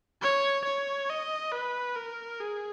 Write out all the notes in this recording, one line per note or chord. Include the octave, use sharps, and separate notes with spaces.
C#5
C#5
D#5
B4
A#4
G#4